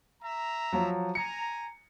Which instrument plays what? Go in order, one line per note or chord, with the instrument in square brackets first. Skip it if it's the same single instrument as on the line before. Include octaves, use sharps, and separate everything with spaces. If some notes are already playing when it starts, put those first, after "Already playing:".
[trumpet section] E5 A#5
[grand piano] F3 F#3
[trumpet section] G#5 A#5 [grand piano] C#7